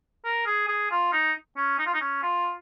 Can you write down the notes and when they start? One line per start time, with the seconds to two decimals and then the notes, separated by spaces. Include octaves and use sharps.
0.25 A#4
0.46 G#4
0.68 G#4
0.91 F4
1.13 D#4
1.57 C#4
1.79 D#4
1.86 F4
1.94 D#4
2.01 C#4
2.23 F4